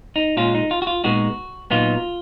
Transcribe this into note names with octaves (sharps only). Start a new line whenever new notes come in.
D#4
A#2 G#3 C#4 F4
D#4
F4
F#4
F4
A#2 G#3 B3 D#4 F#4
A#2 F#3 B3 D#4 F4